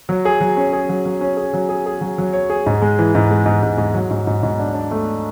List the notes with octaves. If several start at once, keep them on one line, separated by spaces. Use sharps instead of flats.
F#3
G#4
F#3
C#4
G#4
F#3
F#3
C#4
G#4
F#3
G#4
G#4
F#3
F#3
C#5
G#4
G#2
G#3
E3
G#2
G#3
G#2
G#2
G#2
F#3
G#2
G#2
G#2
D4
D4
A3